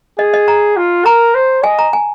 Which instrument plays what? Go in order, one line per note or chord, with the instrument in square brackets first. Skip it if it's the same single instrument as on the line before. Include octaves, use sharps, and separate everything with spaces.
[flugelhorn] G#4 [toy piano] D#5
[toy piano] D#5
A#5
[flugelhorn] F4
[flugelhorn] A#4 [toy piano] A#5
[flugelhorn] C5
[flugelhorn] D#5 [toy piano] G#5
[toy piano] A#5
G#5